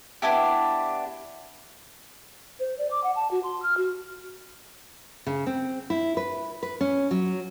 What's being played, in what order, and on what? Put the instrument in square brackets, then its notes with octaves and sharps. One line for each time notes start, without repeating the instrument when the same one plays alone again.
[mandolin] B3 D4 E4 G4
[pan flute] C5
D5
D6
F#5
A5
F#4
C6
F6
F#4
[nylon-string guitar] C#3
C4
E4
B4
B4
C#4
F#3